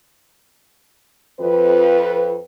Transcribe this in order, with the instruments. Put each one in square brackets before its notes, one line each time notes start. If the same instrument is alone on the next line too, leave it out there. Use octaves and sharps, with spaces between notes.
[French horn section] F2 F3 B4